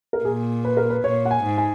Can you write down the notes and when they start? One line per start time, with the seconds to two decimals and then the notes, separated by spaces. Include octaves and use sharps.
0.13 A#4
0.24 A#2 G#4
0.65 B4
0.77 A#4
0.90 B4
1.04 A#2 C#5
1.25 F#5
1.31 G#5
1.44 G#2
1.58 G#5